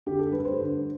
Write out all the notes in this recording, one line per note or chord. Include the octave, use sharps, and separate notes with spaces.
D3 G4
A4
G2 B4
C5
D3